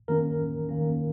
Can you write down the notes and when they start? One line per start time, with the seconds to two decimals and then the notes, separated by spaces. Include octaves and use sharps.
0.08 D#3 A#3 C#4 A#4
0.69 D#3 A#3 C#4